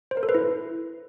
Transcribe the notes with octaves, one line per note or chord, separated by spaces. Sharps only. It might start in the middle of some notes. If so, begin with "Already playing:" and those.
C5
A#4
A4
B4
E4